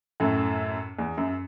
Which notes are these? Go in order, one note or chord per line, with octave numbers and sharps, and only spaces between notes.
F#2 A2
E2
F#2